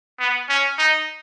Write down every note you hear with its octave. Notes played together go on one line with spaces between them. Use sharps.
B3
C#4
D#4